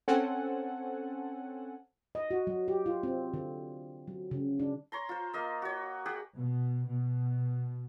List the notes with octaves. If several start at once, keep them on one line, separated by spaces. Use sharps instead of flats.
C4 C#4 A4 F#5 G#5
D#5
F#4
F#3
G4
F4
C4
D3
F#3
C#3
D4
C#5 A#5 C6
F4 C5
A#3 D#5 F5
F#4 C#5
G4 G#4 F#5
B2
B2